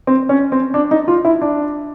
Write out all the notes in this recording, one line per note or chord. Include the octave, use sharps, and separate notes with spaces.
C4
C#4
C4
D4
D#4
F4
E4
D4